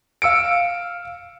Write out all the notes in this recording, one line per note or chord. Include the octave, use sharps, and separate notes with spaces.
F5 E6 C#7 D7